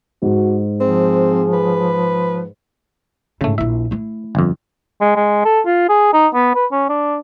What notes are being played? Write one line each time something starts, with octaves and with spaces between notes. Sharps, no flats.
G#2 F#4
F3 C4 G#4
B4
G#2 C#3 A3 E4
A#1 E4 E5
A3 E4
G1 F2
G#3
G#3
A4
F4
G#4
D#4
B3
B4
C#4
D4